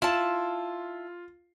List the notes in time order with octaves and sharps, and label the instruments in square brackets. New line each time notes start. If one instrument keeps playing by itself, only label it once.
[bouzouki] E4 A5 [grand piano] F4